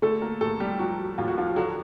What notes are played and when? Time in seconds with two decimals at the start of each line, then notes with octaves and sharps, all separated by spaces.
0.02 D3 A3 A4
0.22 A#3 A#4
0.41 D#2 A3 A4
0.60 G3 G4
0.79 F3 F#3 F#4
1.18 D#2 F4
1.28 F#4
1.38 F3 F4
1.56 D3 F#3 F#4